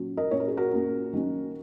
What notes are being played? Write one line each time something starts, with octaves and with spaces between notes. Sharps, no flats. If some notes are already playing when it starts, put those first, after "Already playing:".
Already playing: A#2 F#3 C#4
A#4 D#5
A#2 A#3 C#4 C#5
A#4
G#4
F#4 A#4
A#2 A#3 C#4
D#3 F#3 A#3 C#4